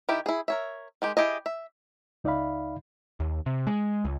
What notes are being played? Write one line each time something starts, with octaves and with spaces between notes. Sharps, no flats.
D#3 E4 G4 E5
E4 G#4
A#4 C#5 E5
D#3 G#3 G4
E4 G4 G#4 D#5
E5
C#2 D#4 D5 E5 F5 B5
D#2
C3
G#3
C#2